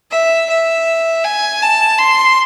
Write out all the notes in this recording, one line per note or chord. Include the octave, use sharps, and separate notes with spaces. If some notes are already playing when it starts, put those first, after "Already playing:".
E5
E5
G#5
A5
C6